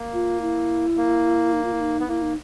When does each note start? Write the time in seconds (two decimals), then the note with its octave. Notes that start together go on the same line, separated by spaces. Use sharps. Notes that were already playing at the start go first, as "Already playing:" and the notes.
Already playing: A#3
0.14 F4
0.41 E4
0.97 A#3
1.53 D#4
1.64 F4
1.73 E4
1.80 D#4
2.00 B3
2.08 A#3 E4
2.22 D#4